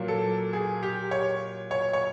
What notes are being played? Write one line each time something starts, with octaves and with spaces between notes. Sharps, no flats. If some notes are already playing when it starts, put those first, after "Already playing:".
Already playing: A#2 F#3 A#3
A4
G#4
G4
C#5
C#5
C#5